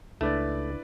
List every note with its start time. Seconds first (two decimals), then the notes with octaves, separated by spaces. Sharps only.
0.21 C#2 A3 D4 E4 B4 D5 D6 A6